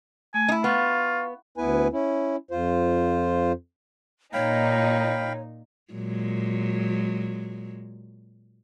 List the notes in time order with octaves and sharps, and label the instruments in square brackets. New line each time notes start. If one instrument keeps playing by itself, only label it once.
[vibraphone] A3 [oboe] G#5
[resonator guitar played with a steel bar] D#4 E4
[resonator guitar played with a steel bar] B3 [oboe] F4 [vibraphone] F5 C#6
[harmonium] D2 B3 E4 B4 G#5
C#4 E4
F2 F4 C5
[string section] A#2 D#4 [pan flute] C#5 [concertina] F5 G5 B5
[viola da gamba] A#2 F#3 G#3